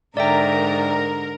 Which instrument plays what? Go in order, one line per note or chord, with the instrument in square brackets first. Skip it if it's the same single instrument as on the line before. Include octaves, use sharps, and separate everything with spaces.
[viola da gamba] G#2 D3 [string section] A#4 [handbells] D5 E5 G5